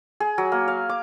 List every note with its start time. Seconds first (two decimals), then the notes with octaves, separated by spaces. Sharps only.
0.20 G#4
0.38 F#3
0.52 A#3
0.68 F5
0.89 D6